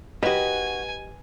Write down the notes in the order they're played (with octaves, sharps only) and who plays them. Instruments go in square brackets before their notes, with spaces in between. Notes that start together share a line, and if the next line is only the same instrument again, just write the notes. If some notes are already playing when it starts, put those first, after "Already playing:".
[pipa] D#3 F#4 [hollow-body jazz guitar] G4 D#5 [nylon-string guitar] B4 [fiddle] G#5